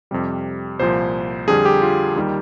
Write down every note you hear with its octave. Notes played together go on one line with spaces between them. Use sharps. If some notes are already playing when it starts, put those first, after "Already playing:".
F2 C3 G3
C2 A#2 F3 C5
F2 D3 G3 G#4
G4
F4
D#2 D#3 G3